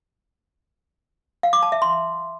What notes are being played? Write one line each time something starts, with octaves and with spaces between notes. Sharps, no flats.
F5
D6
A5
E5
C6